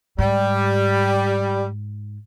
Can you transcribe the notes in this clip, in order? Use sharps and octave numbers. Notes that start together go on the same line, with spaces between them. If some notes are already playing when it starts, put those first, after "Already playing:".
G#2 G3